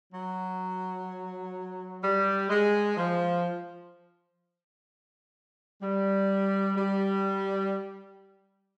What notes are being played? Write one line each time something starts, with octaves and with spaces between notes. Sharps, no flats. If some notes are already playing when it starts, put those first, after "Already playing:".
F#3
G3
G#3
F3
G3
G3